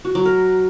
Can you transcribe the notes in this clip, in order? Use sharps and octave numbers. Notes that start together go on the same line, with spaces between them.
F#4
F#3
A#4